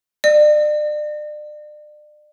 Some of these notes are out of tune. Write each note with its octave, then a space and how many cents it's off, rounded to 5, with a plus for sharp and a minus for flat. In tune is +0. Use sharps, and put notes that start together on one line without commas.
D5 +35